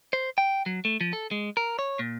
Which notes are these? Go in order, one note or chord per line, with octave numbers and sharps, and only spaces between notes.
C5
G5
F#3
A3
F3
A4
G#3
A#4
C#5
A#2